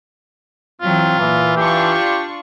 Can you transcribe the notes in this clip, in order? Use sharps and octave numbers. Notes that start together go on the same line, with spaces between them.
E3 F#3 C4 F4
A#2 E3
D4 F4 G4 C#6